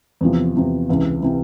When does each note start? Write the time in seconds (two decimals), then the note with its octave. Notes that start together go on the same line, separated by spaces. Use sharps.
0.21 E2 C3 F3
0.56 E2 C3 F3
0.89 C#2 C3 E3
1.23 C3 E3